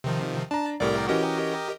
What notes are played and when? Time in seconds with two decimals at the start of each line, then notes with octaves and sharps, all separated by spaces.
0.04 C3 D#3 F3
0.51 D4 A5 A#5
0.80 C2 A2 G4 A#4 D5
1.08 E3 C#4 F#4 G4 A#4 D#5